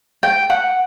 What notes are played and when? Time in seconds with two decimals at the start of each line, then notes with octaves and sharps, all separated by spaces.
0.23 G5
0.50 F#5